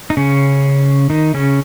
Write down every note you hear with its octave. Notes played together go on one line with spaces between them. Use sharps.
D#4
C#3 C#4
D#3 D#4
C#3 C#4